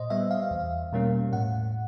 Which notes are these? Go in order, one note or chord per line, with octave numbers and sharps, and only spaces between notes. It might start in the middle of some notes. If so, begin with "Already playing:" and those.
Already playing: A#2 C5 D#5
G3 B3 E5
F5
E2
B2 G3 A#3 C#4
A2 F#5